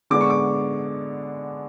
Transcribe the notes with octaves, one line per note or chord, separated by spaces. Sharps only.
D3 G#3 B3 D4 D6
C#6
D6